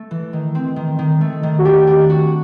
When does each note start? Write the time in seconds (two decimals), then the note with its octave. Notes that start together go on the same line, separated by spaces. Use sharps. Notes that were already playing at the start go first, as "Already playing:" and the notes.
Already playing: A3
0.11 E3
0.33 D#3
0.55 C4
0.76 D#3
0.99 D#3
1.21 A3
1.43 D#3
1.59 F#4
1.65 D4 G4
1.87 D4
2.10 F#4